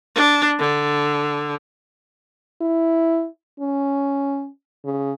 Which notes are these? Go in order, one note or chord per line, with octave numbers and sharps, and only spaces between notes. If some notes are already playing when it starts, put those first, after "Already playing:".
D4
D3
E4
C#4
C#3